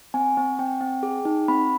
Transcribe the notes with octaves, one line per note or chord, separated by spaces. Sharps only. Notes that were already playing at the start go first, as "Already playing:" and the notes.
C4 G#5
C4
C4 G5
C4
G#4
D#4
C4 B5